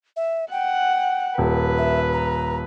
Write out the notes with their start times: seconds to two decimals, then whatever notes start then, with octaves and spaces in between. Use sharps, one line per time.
0.16 E5
0.52 F#5 G5
1.38 D#1 B4
1.78 E5
2.13 A#5